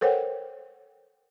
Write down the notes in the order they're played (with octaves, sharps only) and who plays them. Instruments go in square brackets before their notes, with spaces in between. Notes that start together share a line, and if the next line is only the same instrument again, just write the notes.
[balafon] A4 A#4 C5 C#5 F#5 G5